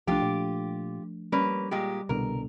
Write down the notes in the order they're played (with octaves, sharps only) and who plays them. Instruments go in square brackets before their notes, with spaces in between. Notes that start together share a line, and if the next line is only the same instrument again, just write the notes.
[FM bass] C2 [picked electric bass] F3 A3 D4 [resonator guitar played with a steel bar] F4 G4
[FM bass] A#2
[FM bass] G3 [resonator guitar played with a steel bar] A#3 C#4 B4
[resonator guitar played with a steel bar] A#2 G#3 G4
[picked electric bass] C2 B2 D3 [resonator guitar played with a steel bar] A#4